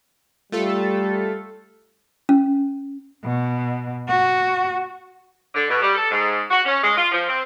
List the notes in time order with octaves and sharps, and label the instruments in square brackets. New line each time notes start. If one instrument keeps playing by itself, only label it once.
[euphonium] G3 [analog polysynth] A3 F4 A4
[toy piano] C#4
[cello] B2
F#4
[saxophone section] D3
B2
G3
A4
G#2
F#4
C#4
G#3
F4
F3
C4